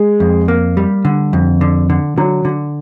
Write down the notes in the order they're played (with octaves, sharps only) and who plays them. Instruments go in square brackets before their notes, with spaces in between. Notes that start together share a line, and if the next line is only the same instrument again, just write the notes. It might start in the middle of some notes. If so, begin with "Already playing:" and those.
Already playing: [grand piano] G#3
[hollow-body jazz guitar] F2
A#3
G3
D3
F2
D3
D3
[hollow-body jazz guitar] D3 [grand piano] F#3
[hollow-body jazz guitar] D3